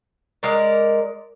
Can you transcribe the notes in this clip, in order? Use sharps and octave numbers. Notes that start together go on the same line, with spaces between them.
G#3 A#4 D5